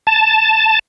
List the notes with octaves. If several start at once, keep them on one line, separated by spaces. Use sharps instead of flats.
A5